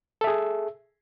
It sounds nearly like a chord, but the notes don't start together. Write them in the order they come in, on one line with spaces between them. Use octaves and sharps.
A4 E5 G#4